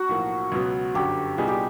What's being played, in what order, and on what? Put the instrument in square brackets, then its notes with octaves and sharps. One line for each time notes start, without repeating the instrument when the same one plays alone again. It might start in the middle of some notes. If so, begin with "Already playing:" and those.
Already playing: [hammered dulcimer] F#4
[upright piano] B1 A2 F3 A#3
C#2 B2 F#3 B3
[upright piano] G1 F#2 D3 [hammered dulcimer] G4
[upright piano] C2 A#2 G3 B3 D#4 [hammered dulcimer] G#4
[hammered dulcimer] G4